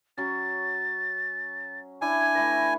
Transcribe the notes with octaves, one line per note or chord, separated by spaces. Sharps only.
F#3 C#4 A6
D4 E4 G#5 G#6
A3 E4 B4 A#6